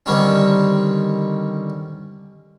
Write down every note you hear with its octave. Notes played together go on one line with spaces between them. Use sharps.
D3 D#3 G3 C4 C#4